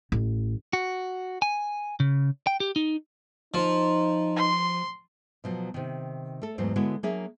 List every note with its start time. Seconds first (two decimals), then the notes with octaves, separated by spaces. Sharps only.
0.12 A1
0.73 F#4
1.42 G#5
2.00 C#3
2.47 G5
2.60 G4
2.76 D#4
3.54 F3 D#4
4.36 C6
5.44 B2 F3 F#3
5.74 C3 D#3
6.42 A3 A4
6.58 E2 G#2 F#3 A3 C5
6.76 D3 G#3 B3 E4 F#4 C#5
7.03 F#3 A#3 D4 G#4 E5